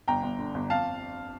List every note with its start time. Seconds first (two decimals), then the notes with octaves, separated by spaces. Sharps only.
0.08 G1 G5 A#5
0.23 G1
0.39 D3
0.54 G1
0.70 F2 F5 A5